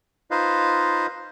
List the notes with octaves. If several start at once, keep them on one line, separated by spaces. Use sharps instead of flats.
D#4 F4 B4 C5 D#5 F5